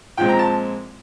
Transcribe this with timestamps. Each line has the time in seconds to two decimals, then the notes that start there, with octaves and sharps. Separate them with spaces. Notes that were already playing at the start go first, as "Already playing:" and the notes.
0.17 A#2 F3 G#3 C4 G5
0.28 A#5
0.39 A5